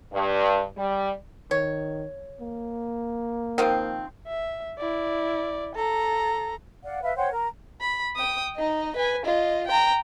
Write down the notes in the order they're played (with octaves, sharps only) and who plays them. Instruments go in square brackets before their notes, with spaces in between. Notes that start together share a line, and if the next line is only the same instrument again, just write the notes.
[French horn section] G2
G3
[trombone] D#3 [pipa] C#5
[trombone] A#3
[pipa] D#3 F3 C4
[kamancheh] E5
E4 D5
A4 A#5
[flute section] D5 F5 F#5
B4 E5 F5
C5 C#5 F#5 G5
A#4 A#5
[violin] B5
G5 D#6
D#4 D#5
B4 G#5
F4 D#5
G5 A#5